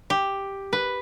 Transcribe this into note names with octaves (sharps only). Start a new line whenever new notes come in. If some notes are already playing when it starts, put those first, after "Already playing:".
G4
B4